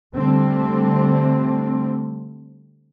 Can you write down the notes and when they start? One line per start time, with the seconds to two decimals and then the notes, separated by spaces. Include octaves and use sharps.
0.16 D3 G3 A3 C4